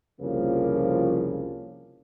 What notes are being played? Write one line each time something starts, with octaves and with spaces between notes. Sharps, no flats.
C2 F2 C#3 F3 A#3